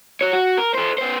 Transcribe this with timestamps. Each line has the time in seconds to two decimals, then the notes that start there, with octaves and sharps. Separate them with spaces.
0.21 F#4 C#5
0.33 F#4
0.58 A#4
0.75 A4 C5
0.98 B3 C5